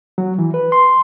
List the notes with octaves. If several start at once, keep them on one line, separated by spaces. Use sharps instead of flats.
F#3
E3
B4
C6